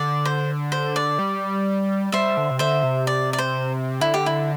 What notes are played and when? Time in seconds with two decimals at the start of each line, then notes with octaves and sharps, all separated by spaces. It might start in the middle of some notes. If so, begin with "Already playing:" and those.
Already playing: D3 D5
0.25 C5
0.72 C5
0.96 D5
1.19 G3
2.12 G3 C5 E5
2.37 D3
2.50 C3
2.59 D3 C5 E5
2.83 C3
3.07 D5
3.33 D5
3.38 C5
4.00 D3 E4
4.14 G4
4.26 E4